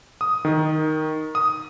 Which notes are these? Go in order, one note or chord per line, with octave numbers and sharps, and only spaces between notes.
D#6
D#3
D#6